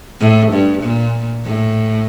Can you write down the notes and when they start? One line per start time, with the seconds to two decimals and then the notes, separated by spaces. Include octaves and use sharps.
0.21 A2
0.52 G2
0.83 A#2
1.45 A2